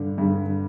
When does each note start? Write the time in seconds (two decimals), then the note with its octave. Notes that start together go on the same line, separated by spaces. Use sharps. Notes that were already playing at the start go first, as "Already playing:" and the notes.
Already playing: G2 D3
0.18 G2 D3